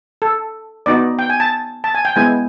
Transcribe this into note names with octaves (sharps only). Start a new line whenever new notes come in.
A4
B3 D#4 F#4 D5
G5
G#5
A5
A5
G#5
G5
G#3 B3 E4 G#5